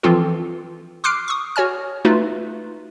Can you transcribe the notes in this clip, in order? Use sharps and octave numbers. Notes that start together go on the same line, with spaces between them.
E3 F3 C4 F4 A4
C6 D6 F6 F#6 C7 D7
C#6 D#6
F#4 C#5 G#5 F6
A3 D#4 F4 F#4 B4